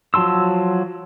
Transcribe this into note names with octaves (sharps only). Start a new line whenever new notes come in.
F3 F#3 A5 C6 E6